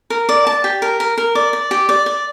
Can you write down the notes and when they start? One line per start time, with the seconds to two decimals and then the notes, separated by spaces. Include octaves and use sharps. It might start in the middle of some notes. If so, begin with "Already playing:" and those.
0.10 A#4
0.29 D5
0.47 A5
0.64 G4
0.82 A#4
1.00 A#4
1.18 A#4
1.35 D5
1.53 D5
1.71 G4
1.89 D5
2.06 D5